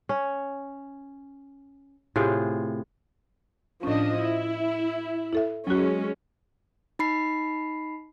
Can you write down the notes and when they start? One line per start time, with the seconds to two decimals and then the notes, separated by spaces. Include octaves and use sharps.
0.09 C#4
2.16 A2 C3 F4 G#4
3.83 A2 F3 C#4 D4 D#5
4.18 E4
5.33 E4 A4 E5
5.67 F#3 G#3 C#4 F#4
6.99 D#4 B5 C7